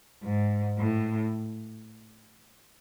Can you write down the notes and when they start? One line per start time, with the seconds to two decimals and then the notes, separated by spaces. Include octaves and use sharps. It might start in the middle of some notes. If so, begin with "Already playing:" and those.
0.23 G#2
0.78 A2